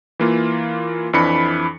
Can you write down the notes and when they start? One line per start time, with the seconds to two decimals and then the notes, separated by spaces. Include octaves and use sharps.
0.19 E3 A#3 F4
1.13 F2 E3 D4 B5 C#7